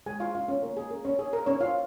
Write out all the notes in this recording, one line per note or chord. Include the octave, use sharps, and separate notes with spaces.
G#3 G#4 G#5
F4 F5
C#4 F4 F5
C#4 C#5
A#3 A#4
G#4
C#4 A#4
C#4 C#5
D#4 G#4
A#4
C#4 D#4 C#5
F4 F5